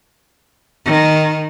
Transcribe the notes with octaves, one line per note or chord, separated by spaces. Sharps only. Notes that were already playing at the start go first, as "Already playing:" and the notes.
D#3